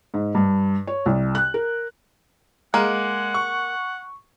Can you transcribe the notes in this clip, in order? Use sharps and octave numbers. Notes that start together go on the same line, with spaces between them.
G#2
G2
C#5
C2
F#6
A#4
G#3 A#3 F#5
C#6